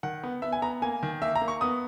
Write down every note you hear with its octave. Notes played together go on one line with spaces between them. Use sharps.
D#3 F#5
B3
B3 E5
G#5
B3 A#5
A#3 G#5
D#3
A#3 E5
A#5
A#3
C#6
B3 D#6